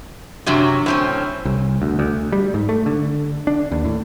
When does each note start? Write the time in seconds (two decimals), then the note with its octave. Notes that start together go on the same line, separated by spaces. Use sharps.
0.47 F#2 C3 F#3 D4
0.86 A2 C4 C#4
1.45 C2
1.82 D2
1.99 D2
2.32 G3
2.54 G#2
2.69 A3
2.86 D3
3.47 D4
3.72 D#2
3.85 A2